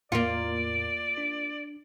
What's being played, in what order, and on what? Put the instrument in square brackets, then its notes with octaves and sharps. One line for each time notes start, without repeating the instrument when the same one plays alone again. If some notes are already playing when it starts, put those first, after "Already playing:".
[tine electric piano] E2 A2 [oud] A#3 F4 [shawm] D5
[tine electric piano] D4